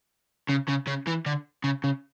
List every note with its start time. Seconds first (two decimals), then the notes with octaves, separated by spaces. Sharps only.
0.49 C#3
0.68 C#3
0.87 C#3
1.07 E3
1.26 D3
1.64 C#3
1.84 C#3